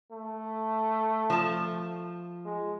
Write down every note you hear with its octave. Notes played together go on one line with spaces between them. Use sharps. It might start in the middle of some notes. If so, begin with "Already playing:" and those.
A3
F3 A5
G#3